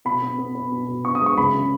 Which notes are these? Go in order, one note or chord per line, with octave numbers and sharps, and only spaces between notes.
B2 B5
B3
B3
B3
B2
B2
B2 C#6
D#6
G#3
C#6
C#2 B5
C#3